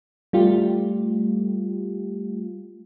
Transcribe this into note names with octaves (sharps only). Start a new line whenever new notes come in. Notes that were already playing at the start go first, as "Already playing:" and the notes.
G3 A3 F4 G4